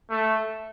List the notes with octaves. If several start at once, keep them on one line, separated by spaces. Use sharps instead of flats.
A3